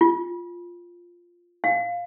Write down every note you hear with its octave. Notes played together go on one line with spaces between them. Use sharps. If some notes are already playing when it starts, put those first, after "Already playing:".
F4
F5